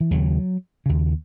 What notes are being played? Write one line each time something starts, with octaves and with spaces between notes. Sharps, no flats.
E3
D#2 C#3 F#3
D#2 C#3